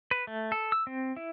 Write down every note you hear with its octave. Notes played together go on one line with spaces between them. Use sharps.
B4
A3
A4
E6
C4
E4